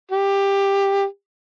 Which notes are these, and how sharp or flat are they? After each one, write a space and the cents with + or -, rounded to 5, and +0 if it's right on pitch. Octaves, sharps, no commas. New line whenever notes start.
G4 +15